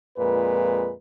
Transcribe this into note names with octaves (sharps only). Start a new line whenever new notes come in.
F2 A#2 G#3 B4